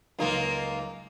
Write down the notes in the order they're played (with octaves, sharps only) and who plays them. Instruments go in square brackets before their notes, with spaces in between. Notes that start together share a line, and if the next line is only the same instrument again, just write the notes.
[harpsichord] C#2 F#3 G#3 [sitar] A#3 D#4 F4